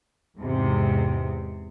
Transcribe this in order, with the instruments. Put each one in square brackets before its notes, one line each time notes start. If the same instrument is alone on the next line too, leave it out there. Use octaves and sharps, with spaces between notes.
[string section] E2 G#2 C3